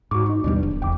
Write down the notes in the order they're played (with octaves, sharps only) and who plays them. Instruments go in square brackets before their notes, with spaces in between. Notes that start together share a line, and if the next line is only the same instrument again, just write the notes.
[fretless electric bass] G#2 [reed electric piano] F#4 C#6 D6
[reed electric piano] D#4
[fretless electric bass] D#2 B2 G3 [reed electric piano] B3 D4
[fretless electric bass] D1
[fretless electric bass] F#1 E2 [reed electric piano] G5 D6